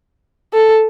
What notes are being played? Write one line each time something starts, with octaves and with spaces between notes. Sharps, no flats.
A4